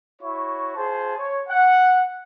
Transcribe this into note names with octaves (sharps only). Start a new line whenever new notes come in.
E4 F#4 C#5 C#6
F4 G#4 C5 A5
C#5
F#5